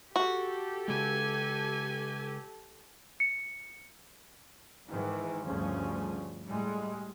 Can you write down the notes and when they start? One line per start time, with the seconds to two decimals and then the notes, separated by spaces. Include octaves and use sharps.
0.16 F#4 G4 A4
0.88 C#3 G#3 G#5
3.20 C#7
4.89 G#2 D#3 E3
5.43 D2 G2 C#3 F3 C#4
6.48 A2 G3 G#3